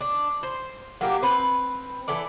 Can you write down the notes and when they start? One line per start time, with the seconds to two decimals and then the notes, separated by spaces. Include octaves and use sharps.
0.01 D4
0.43 C5
1.01 F#3 A#3 F#4 G4
1.22 C4 B4
2.08 E3 E4 A4 D5